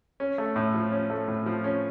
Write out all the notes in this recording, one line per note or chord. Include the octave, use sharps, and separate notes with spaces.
C#4
A3
A2
F3
C#4
A3
A2
F3
C#4